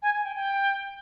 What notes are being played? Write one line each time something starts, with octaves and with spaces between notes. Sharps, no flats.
G#5
G#5
G5
G5